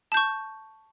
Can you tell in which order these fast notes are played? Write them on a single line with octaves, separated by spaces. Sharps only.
A5 G6 C#6